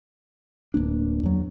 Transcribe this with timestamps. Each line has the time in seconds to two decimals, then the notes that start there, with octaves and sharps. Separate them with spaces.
0.74 D1 A2 A#3 D4
1.23 E2 F#3